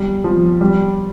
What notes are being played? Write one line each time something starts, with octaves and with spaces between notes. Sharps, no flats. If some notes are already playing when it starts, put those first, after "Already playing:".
Already playing: G3
F3
G3